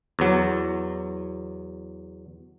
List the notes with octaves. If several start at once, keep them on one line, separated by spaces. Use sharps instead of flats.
E2 F#3